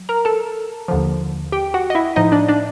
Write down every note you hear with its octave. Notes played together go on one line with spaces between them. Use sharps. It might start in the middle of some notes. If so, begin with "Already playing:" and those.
Already playing: F#3
A#4 A#5
A4 A5
D#2 D3 F3
G4 G5
F#4 F#5
D#5
E4 E5
A2 F3 D#4 D#5
D4 D5
D4 D5